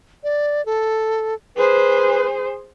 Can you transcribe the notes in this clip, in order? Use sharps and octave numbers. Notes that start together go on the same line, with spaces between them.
D5
A4
G#4 B4 C5